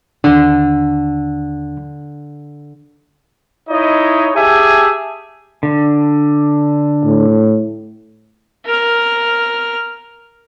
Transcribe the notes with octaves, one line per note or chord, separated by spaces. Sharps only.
D#2 D3 D4
D#4 E4 C#5 D#5
G4 G#4 E5 G#5 A5
D3
A2
A#4 F6